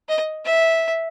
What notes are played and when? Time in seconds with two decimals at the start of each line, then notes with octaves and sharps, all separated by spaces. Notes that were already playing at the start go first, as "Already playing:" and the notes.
0.09 D#5
0.46 E5